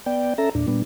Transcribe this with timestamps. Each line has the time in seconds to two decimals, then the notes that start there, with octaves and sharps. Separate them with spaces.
0.06 B3 D5 G5
0.38 C#4 A4 E5 A#5
0.55 E2 A#2 D4
0.68 A#2 G3 B3 D4